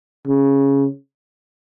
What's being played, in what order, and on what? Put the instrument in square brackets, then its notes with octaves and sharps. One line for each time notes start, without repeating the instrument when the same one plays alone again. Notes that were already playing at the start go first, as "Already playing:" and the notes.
[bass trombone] C#3